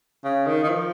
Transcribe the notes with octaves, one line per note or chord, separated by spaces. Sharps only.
C#3
D#3
D#3
F3